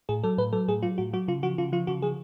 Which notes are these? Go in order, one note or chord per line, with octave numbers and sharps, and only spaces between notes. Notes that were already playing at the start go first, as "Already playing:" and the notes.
A2 G#4
F#3 A4
A2 B4
F#3 A4
A2 G#4
F#3 F4
A2 F#4
F#3 F#4
C#3 F4
F3 F#4
C#3 F4
F3 F4
C#3 F#4
F3 G#4